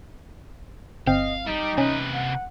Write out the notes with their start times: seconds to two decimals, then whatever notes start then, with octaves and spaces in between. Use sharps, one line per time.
1.07 G1 C4 D#5 F5 G5
1.46 G3 D#4 G4
1.78 C3 C#4 B4
2.14 F#5